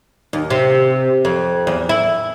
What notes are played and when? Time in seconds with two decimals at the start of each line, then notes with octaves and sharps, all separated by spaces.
0.33 D#2
0.50 C3
1.25 F2
1.67 E2
1.89 E4